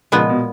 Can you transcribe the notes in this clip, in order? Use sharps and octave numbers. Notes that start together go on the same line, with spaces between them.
A#2 C#3 F3 G#3 B3
B2